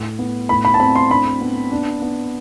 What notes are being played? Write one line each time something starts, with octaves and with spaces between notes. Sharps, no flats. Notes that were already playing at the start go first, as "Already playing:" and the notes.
Already playing: A2
B3
A2 B5
B5
A5
C4 B5
C6
D4 B5
B3
D4
B3